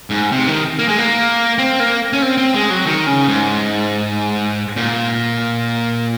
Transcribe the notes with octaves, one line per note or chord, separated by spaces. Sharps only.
G#2
C3
D#3
A#3
G#3
A#3
C4
A#3
C#4
C4
C4
G#3
F#3
D#3
C#3
G#2
A#2